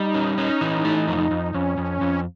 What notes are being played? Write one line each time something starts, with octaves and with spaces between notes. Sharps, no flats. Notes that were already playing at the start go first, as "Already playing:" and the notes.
Already playing: G3 D#4
C#4
C#4
E3
A3
F2
F2
F2 C#4
F2
F2